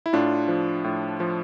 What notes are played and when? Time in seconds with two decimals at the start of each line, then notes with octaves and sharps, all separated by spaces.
0.06 E4
0.13 A2 D4 F4
0.48 F3
0.84 A2
1.20 F3